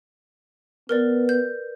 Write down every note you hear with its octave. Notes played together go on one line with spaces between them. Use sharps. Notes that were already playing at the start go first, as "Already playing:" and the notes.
B3 A#4 B4 D5
G6